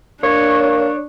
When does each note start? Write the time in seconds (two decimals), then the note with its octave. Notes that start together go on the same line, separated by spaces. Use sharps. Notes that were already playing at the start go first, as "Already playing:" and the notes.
0.23 A#3 D4 C#5